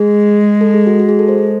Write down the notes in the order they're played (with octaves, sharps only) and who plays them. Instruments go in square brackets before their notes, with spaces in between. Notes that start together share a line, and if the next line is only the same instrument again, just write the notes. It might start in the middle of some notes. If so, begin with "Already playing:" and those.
Already playing: [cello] G#3 [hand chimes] G#4
[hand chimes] A4
G#4
F#4
F#4
G#4
A4
C5